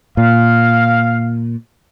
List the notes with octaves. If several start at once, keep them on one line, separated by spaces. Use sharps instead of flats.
A#2 F5